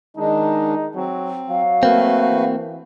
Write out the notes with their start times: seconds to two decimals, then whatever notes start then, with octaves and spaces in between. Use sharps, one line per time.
0.17 D#3 G#3 D4 D#4
0.95 F#3 C4
1.49 F#3 F5
1.83 A3 A#3 C4 F#4 B4
2.28 E3